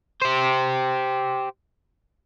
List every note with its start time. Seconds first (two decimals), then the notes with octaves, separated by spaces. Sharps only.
0.22 G4 C5